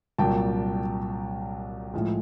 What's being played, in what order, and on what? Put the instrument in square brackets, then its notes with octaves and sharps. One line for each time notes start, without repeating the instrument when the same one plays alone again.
[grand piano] C2 A#2 F#3 G5 A5
A2 F3 G#3